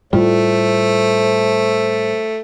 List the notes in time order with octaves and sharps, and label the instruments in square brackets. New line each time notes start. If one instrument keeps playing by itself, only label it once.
[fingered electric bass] A2 G3 [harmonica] A3 [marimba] F4 [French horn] C5